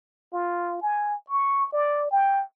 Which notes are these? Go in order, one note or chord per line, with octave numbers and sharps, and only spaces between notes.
F4
G#5
C#6
D5
G5